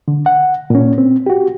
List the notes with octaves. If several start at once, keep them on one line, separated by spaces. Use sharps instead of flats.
D3
F#5
A#2 C#4
C4
F#4 G4